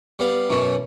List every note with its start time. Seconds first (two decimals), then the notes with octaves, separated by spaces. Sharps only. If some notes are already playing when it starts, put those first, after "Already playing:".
0.19 G3 B3 F5
0.50 F#2 B2 E3 C#4